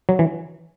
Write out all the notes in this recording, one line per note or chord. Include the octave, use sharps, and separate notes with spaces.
F#3
E3